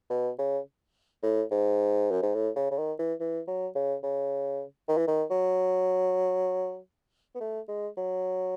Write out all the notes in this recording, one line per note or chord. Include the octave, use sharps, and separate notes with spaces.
B2
C#3
A2
G#2
F#2
G#2
A2
C#3
C#3
D#3
E3
E3
F#3
C#3
C#3
D#3
E3
D#3
F#3
B3
A3
G#3
F#3